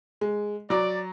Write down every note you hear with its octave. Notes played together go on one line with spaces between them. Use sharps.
G#3
F#3 D5 A#5